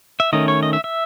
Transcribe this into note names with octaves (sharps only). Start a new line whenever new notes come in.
E5
D#3 A3 C#4 D#5
C#5
D#5
E5
E5